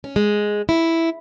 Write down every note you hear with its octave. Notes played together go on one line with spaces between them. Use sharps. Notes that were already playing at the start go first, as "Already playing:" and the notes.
C#4
G#3
E4